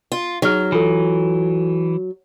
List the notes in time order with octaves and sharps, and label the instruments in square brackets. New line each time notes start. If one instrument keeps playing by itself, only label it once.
[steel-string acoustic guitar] F4
[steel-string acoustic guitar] F#3 [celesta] D#4 G#4 F6
[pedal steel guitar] E3 [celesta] F4 A4